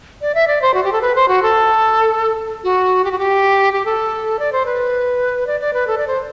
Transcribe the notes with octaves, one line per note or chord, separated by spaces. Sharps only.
D5
E5
D5
C5
F#4
G4
A4
B4
C5
F#4
A4
F#4
G4
F#4
G4
G4
A4
D5
C5
B4
D5
D5
B4
A4
D5
C5